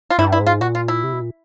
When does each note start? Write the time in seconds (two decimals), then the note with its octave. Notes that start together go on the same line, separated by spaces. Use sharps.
0.10 F4
0.19 G2 E4
0.32 E4
0.40 G#2
0.46 F4
0.61 A#2 F#4
0.75 F4
0.88 E4
1.04 C3
1.13 B2
1.21 A#2